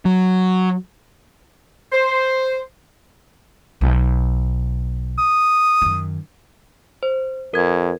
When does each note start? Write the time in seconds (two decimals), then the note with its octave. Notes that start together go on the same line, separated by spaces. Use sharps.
0.05 F#3
1.92 C5
3.81 B1
5.18 D#6
5.82 F#2 D#3
7.03 C5
7.54 F2 A#4 G#6